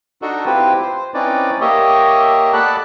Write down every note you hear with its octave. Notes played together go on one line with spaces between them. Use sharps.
D4 D#4 F#4 A4
C4 E4 F4 G4 B4
C5
C4 C#4 D#4 E4 B4 D5
A#3 G4 C#5 D#5 E5
A4 D5 F#5 A5 B5 F#6